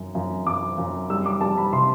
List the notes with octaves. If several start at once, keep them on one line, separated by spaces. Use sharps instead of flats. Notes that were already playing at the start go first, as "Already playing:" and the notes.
Already playing: F#2
F#2
F#2 D6
F#2
G3 E6
D6
G3 A5
B5
C3 C6